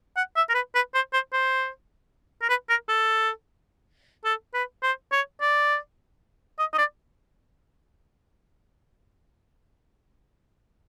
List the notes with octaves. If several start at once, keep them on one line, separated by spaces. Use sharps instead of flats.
F#5
E5
A#4
B4
B4
C5
C5
C5
A#4
B4
A#4
A4
A4
B4
C5
C#5
D5
D#5
D#5
D5